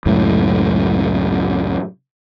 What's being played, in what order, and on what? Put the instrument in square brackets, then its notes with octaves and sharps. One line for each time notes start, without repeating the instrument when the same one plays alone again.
[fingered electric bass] C#2 F#2 A2